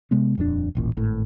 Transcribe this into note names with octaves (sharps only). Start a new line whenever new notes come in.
C3 G#3 B3
D#1 F2 F#3 D4
D#1 A1 A#2
G#1 A2